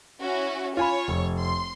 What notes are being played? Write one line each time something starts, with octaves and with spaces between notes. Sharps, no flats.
C#4 E4 F#4
F4 C#5 G#5 B5 C#6
F1
C6